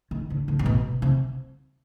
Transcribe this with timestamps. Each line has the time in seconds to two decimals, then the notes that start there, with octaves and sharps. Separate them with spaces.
0.11 D#3
0.30 D3
0.48 D3
0.59 G#2
0.66 B2
1.02 C3